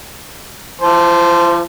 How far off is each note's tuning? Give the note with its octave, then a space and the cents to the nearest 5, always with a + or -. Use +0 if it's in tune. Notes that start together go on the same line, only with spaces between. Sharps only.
F3 -45 C5 -10 A5 +0